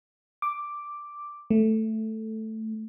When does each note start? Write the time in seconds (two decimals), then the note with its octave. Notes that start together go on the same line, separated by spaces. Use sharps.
0.42 D6
1.50 A3